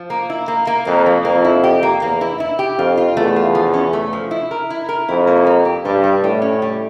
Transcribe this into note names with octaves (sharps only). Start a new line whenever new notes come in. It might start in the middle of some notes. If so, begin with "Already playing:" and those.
Already playing: F3
A#3
E4
A#3
A#3
F2 A#3
F3
F2 A#3
E4
G4
A#3
E2 A#3
E4
E4
G4
F2 F4
F4
E2 A3
F4
F3
C#4
A3
F3
E4
A#4
E4
A#4
F2 E4
A#3
A#3
G4
G2 G3
G3
A2 G3
C#4
G3